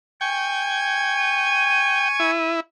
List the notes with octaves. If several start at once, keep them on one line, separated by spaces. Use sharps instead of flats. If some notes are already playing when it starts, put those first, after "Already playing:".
G5 G#5 C#6 G#6
D#7
E4